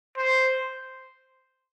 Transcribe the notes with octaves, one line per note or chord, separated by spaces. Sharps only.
C5